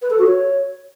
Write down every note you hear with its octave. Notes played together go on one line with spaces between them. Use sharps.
B4
A4
F#4
C#5